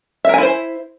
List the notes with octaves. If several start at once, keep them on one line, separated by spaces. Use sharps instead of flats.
E4 A#4 C5 E5 G#5